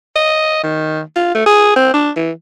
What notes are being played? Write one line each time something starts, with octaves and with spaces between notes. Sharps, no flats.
D#5
D#3
F4
A3
G#4
C4
D4
E3